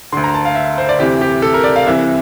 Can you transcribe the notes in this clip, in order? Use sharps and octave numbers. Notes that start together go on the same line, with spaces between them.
D2 D3 C6
A#5
A5
F5
E5
C5
D5
D2 C3 E3 G4
G4
A4
A#4
D5
F5
C2 C3 E3 E5